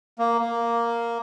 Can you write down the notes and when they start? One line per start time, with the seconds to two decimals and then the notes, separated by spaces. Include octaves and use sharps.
0.19 A#3
0.40 A#3